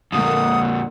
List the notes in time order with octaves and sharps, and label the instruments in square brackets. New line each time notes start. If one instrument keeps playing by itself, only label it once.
[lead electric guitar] F2 A#2 [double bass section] D3 A#3 [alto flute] F#5 [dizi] D#6